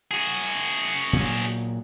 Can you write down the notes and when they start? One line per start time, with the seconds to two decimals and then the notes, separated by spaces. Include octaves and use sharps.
0.11 F#4 G#4
1.13 A#2 F#3